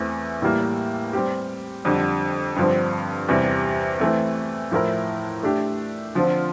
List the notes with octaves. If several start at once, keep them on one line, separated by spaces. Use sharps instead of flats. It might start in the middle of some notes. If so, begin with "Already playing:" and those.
Already playing: E2 E3 A3 C4
A2 E3 G3 A#3
G3 C4 G4
F2 D3 G3
G2 D3 F3 C4
E2 C3 G3
E3 A3 C4
A2 F3 A3 E4 A#4
A3 D4 G4
D3 F3 C4 F4